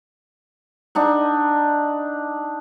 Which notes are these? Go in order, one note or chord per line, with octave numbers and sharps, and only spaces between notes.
D4 D#4 F#5